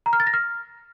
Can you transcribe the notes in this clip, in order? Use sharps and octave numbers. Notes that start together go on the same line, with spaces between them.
A#5
F6
A6
A#6
F6